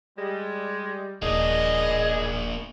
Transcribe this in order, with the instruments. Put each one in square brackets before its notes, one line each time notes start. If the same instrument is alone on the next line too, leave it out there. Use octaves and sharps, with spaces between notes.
[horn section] G3 [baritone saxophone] G#3
[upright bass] D#1 [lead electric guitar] A#3 D4 [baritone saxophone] G#4 [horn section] D#5